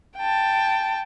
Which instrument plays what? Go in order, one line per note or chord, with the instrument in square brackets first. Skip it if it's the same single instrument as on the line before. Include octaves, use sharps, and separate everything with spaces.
[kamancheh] G5 A5